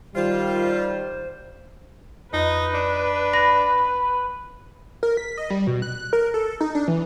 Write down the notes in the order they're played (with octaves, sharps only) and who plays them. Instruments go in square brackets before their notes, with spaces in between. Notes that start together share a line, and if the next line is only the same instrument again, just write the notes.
[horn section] D#3 G3 [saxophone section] F4 [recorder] C5
[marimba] F2 D#5 [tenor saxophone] D#4 [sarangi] B4
[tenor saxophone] D4
[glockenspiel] B5 [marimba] A#6
[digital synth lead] A#4
B6
D#5
G3
B2
F#6
A#4
A4
D#4
D4
E3